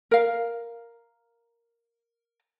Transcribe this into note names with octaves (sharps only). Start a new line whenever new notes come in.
A#4 F5